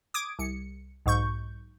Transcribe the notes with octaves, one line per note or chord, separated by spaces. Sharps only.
D6 D#6 G#6 D7
C2 C#7
B1 G#2 C#6 G6